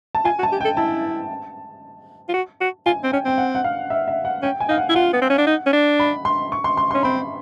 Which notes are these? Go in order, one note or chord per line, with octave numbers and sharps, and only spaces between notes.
A5
F4 G#5
F#4
A5
G4
A4 G5
E4 A5
F4
F#4
F#4
F4 G#5
C4
C#4 G5
C4 G5
F#5
F#5
F5
E5
E5
F#5
C#4 G5
G#5
D#4 F5
F#5
E4
F4 F#5
B3
C4
C#4
D4
D#4
C#4
D4
B5
C6
C#6
C6
C6
C#4 C6
C4 B5